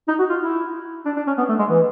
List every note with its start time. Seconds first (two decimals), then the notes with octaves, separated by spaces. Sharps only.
0.08 D#4
0.19 F#4
0.29 F4
0.41 E4
1.06 D4
1.17 D4
1.27 C#4
1.38 B3
1.49 A3
1.59 G#3
1.70 E3